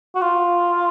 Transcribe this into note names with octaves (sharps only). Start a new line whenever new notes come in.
F#4
F4